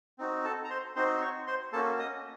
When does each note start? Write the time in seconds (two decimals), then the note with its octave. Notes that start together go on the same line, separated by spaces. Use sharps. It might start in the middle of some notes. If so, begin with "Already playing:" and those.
0.18 C4 D#4 F#4
0.45 A4 A5
0.65 A#5
0.70 C5 C6
0.96 C4 D#4 F#4 C5 C6
1.17 C6
1.21 C#5 C#6
1.47 C5 C6
1.73 A#3 C#4 F#4 A4 A5
1.99 D#5 D#6